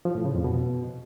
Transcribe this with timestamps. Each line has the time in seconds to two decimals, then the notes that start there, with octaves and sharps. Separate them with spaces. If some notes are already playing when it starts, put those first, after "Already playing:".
0.05 F3
0.15 A2
0.25 C#3
0.35 F2
0.44 B2